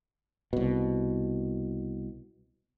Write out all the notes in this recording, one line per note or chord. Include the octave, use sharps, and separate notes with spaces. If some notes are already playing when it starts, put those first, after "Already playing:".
C2 B2